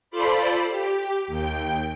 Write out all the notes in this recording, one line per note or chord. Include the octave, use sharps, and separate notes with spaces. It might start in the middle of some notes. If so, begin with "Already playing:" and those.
F4 A4 C5 D5 B5
G4
D#2 G5